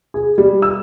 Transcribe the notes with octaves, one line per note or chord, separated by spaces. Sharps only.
G#4
G3
E6